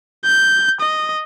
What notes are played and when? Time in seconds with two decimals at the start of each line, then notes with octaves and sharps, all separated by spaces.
0.25 G6
0.81 D#5